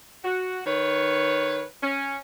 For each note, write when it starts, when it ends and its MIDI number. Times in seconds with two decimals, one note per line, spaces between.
0.24 0.61 66
0.66 1.63 51
0.66 1.63 71
0.66 1.63 73
1.82 2.18 61